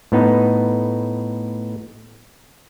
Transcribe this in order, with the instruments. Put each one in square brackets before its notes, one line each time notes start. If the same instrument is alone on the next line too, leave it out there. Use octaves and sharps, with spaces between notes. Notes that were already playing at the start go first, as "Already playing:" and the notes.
[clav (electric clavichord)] A2 B3 D#4